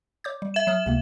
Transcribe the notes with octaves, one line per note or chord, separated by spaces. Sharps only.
C#5 D6 G6
G3
E5 E7
F#3 D#6 F6
C#2 C3 A#3